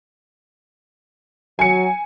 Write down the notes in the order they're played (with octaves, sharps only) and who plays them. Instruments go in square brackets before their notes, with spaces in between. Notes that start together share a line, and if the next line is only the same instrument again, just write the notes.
[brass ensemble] F#3 [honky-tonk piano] G#5 C#7